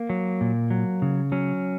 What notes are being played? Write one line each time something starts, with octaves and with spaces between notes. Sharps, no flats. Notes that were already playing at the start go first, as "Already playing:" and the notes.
Already playing: A#3
F#3
A#2
F#3
C#3
F#3 C#4